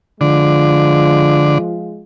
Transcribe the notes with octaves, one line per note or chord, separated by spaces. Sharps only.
D3 F3 G#3 F4